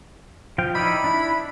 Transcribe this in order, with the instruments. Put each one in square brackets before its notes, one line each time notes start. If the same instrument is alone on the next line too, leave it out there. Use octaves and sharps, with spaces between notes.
[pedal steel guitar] F3 F5 G5
[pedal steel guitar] D#4 E4 D5 [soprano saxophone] B5
[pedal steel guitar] D4 E4